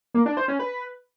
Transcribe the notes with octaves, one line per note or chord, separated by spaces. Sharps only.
A#3
D4
C5
C#4
B4